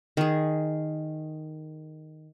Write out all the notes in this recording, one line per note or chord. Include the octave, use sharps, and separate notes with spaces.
D#3 G#4